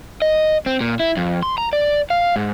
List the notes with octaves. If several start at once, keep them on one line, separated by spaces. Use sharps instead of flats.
D#5
C4
A#2
E4
F2
C6
A#5
D5
F5
G#2